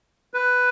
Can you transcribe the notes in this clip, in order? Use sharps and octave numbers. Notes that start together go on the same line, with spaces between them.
B4